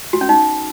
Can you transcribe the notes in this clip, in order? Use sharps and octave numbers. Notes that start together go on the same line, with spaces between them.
F#4
C#4
D#4